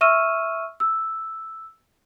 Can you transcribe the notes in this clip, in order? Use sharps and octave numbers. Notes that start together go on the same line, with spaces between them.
E5 C#6 E6 F6 D#7 E7
E6